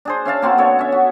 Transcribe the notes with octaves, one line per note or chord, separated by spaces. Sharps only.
D4 G#4 C5
C#4 E5 F5 A5
A#3 C4 F#4 C6
D3 B3 A4 C#5
C#4 E5
F#4